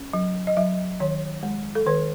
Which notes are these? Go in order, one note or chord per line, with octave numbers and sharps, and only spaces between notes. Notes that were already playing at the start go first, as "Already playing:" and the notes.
Already playing: C#4
F#3
D#5
F#3 E5
D#3 C#5
G#3
A4
D#3 B4